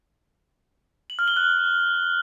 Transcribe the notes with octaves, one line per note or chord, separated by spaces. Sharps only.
F#7
F6
G7
F#6